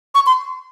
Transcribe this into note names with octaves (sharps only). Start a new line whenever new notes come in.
C#6
C6